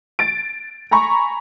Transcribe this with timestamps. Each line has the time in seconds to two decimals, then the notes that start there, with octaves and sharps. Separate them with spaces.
0.19 A6 D7
0.91 G#5 A#5 B5 C#6